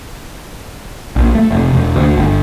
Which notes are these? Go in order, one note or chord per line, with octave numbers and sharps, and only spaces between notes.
A#1
A3
F1
E1
D2
G1